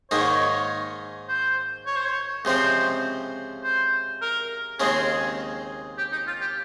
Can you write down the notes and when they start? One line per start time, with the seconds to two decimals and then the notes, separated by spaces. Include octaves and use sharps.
0.11 G#2 D#3 A#3 D#4 C#5
1.29 C5
1.86 C#5
1.96 C5
2.06 C#5
2.45 C#2 C3 F3 C4 C5
3.63 C5
4.22 A#4
4.80 D#2 C#3 G#3 C4 G#4
5.98 G4
6.12 D#4
6.27 F4
6.41 G4